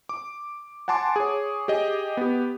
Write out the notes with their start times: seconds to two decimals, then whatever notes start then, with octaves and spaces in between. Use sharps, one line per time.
0.09 D6
0.88 F#5 G#5 A5 C6 D6
1.16 G#4 C#5
1.68 G4 G#4 D#5
2.17 B3 G4